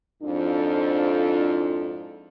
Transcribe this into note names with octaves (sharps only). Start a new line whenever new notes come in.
F2 G#2 F3 D4 E4 A4